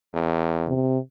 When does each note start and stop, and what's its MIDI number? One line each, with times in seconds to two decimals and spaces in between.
0.13 0.71 40
0.68 0.98 48